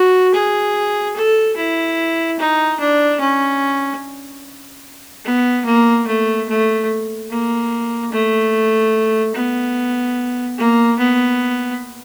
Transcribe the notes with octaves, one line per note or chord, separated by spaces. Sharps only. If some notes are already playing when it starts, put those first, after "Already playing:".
Already playing: F#4
G#4
A4
E4
D#4
D4
C#4
B3
A#3
A3
A3
A#3
A3
B3
A#3
B3